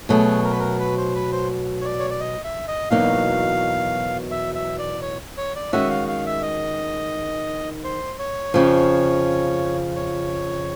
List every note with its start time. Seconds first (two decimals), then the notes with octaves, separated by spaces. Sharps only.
0.09 B2 F#3 A3 G#4
0.44 A#4
0.52 B4
0.60 A#4
0.79 B4
0.98 C5
1.15 B4
1.32 C5
1.81 C#5
1.85 D5
1.99 C#5
2.10 D5
2.20 D#5
2.44 E5
2.68 D#5
2.90 E2 B2 F#3 A#3 D#4 F5
4.31 E5
4.55 E5
4.79 D5
5.02 C#5
5.37 C#5
5.56 D5
5.73 D#3 G#3 C#4 F#4 E5
5.90 F5
6.08 F5
6.26 E5
6.43 D#5
7.84 C5
8.19 C#5
8.54 F2 C#3 F3
9.96 C#5